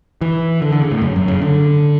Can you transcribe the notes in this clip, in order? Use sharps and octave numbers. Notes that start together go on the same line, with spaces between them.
E3
D3
D3
C#3
A2
F#2
F#2
C#3
D3